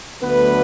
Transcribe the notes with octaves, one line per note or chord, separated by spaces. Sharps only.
D2 D3 F#3 A3 B3 B4